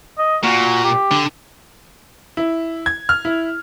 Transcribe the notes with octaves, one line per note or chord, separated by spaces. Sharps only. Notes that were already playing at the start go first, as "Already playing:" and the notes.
D#5
A#2 F#4
G4
D3
E4
G#6
F6
E4